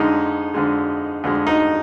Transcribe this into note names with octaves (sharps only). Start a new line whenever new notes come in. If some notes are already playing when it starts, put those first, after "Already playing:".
Already playing: F2 D3 G#3 D#4
F2 D3 G#3
F2 D3 G#3
D#4